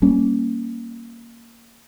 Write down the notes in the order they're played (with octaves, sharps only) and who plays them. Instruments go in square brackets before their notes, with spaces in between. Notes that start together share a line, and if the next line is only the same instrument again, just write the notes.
[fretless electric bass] G3 A#3 C#4